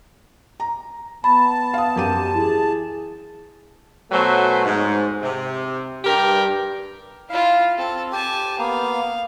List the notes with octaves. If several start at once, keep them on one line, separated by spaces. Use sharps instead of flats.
A#5
B3 A5 B5
F5 D#6
F#2 G4 D#7
E3 G#4
B2 F#3 A3 B4 C5 G#5
G#2
C3
G2 G4 A#4
E4 F4 F5
C4 A4
G4 G#5 A5
A#3 B3 F5